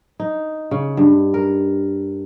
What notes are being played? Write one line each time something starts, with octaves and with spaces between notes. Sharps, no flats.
D#4
C#3
G2
A#4